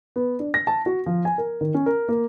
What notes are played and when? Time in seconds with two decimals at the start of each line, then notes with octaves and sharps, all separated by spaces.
0.16 B3
0.39 D4
0.54 A#6
0.67 A5
0.86 F#4
1.06 F3
1.25 G#5
1.38 A#4
1.61 D#3
1.74 C#4
1.86 A#4
2.09 A#3